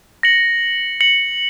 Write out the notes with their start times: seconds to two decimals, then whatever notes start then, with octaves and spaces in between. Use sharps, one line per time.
0.23 A#6 C#7 F#7
1.00 A#6 C#7 F#7